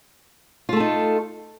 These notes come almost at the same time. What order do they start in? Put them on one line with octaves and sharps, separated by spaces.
F4 A3 A4 D#4